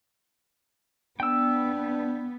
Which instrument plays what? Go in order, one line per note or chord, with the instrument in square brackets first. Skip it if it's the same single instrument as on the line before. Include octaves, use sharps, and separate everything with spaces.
[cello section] B3 [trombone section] D4 [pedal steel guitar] G5 E6